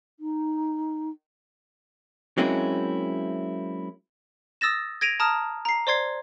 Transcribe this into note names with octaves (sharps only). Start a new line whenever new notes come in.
D#4
F#3 G#3 A#3 C4 C#4 E4
D#6 E6 A6 A#6 E7
G#6 A#6 D7 D#7 F7
A5 A#5 D#6 F6
A#5 C7
C5 D5 C6 G#6 C7